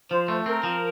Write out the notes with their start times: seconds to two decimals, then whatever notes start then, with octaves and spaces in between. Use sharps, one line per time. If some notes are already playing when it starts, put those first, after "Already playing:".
0.11 F3 C5
0.28 A3
0.46 C4 A#4
0.64 F3